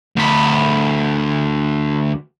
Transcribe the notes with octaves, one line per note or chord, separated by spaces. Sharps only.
D2 B5